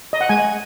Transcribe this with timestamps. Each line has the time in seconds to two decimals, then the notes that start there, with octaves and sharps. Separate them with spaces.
0.13 D#5
0.21 F#5
0.29 G#3 G#5